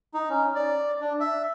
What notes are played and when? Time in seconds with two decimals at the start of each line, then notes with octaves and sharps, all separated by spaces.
0.14 D#4
0.30 C#4
0.55 D5
1.01 D4
1.20 E5